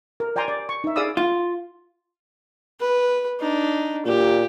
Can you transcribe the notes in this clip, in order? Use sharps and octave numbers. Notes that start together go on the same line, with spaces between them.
A#4
D5 G5 G#5 A#5 C6
D5
C#6
D#4 E5
G#4 D5 F5 B5 D#6 E6
F4
B4
D4 D#4
A#2 G4